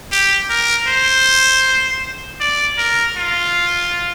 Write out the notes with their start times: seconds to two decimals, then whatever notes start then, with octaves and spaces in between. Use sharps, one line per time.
0.12 G4
0.50 A#4
0.87 C5
2.40 D5
2.78 A#4
3.17 F4